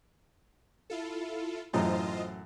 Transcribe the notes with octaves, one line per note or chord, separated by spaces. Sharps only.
E4 F4 A4
F#2 A2 E3 F4 C5 D#5